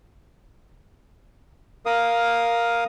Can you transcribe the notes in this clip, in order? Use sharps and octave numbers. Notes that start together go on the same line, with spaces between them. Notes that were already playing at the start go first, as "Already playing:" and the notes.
A#4 F5 D#6